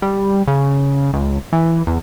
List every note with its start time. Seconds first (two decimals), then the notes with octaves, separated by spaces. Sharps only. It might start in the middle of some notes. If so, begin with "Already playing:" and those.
0.02 G3
0.48 C#3
1.13 C#2
1.53 E3
1.87 E2